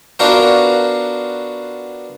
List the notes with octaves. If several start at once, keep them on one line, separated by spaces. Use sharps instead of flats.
B3 D4 F4 F#4 A#4 C5